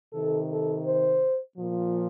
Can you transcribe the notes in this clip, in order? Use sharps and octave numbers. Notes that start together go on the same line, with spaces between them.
C3 D#3 A4
A4
C5
A#2 F3